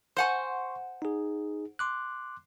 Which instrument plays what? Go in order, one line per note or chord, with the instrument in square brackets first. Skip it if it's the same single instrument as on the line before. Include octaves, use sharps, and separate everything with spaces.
[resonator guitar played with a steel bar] C5 F#5 G#5 [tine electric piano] C6 C#6
[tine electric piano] D#4 G#4
C6 D6 F#6